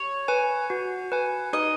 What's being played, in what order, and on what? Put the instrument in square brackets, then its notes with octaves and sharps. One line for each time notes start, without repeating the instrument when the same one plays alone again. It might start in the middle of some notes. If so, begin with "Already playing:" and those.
Already playing: [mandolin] C#5
[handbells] B4 G#5
F#4
B4 G#5
[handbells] D#4 [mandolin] D#5